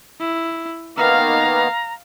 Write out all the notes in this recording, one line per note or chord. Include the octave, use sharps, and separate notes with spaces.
E4
D#3 A#3 B3 F5 A#5 F6